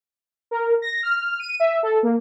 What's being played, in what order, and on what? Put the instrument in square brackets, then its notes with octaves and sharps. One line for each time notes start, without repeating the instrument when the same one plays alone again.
[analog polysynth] A#4
A#6
F6
D#7
E5
A4
A#3